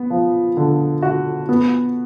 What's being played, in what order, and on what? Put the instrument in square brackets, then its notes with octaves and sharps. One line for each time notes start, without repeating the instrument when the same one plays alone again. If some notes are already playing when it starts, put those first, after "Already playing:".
Already playing: [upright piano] B3
F3
D3
F#4
B3